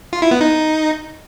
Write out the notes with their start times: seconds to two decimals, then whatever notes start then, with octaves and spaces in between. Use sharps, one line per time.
0.13 F4
0.22 E4
0.31 B3
0.41 D#4